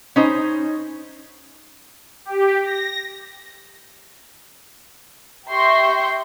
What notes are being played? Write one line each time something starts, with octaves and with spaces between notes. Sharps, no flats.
C#4 D#4 C5
G4
A#6
G4 E5 C6 C#6 G6 A#6